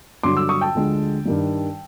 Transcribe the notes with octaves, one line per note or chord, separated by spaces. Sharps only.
G2 D3 F#3 C6 D6
D6 E6
C#6 D#6
G5 A5
D2 D3 F3 G#3
G2 D#3 G3